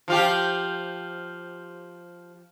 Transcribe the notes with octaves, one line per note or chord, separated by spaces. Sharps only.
F3 F4 G4